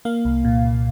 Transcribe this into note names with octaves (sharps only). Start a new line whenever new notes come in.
A#3 F5
C2
A#2
C2